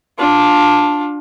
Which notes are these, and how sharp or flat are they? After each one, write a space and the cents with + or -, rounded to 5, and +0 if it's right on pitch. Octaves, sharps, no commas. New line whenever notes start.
D4 +0 F4 +20